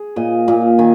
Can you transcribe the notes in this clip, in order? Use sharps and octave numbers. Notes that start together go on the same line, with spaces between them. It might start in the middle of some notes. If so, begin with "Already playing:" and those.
Already playing: G#4
A#2 D#5
A#2
D#3 G#5